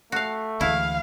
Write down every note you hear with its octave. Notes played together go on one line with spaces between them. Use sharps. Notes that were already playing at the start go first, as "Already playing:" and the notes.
A3 F#4 F5
D2 E3 G#3 E4 F5